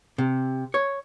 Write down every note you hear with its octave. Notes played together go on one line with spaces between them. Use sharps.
C3
C#5